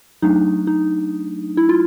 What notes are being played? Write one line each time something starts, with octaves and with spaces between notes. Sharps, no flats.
F#3 A3 D4 D#4
D#4
E4
F4